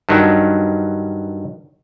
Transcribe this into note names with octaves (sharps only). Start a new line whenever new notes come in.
G2 D#3 F#3